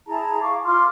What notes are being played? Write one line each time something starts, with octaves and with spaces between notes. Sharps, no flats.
E4 G#4 A5 A#5
F5 C#6 D6
F4 C6 D6 F6